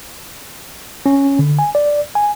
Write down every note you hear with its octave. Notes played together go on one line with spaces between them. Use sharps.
C#4
D3
G#5
D5
G#5